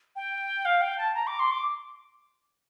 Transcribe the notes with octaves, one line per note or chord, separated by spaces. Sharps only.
G5
F5
G5
A5
A#5
D6
C6
D6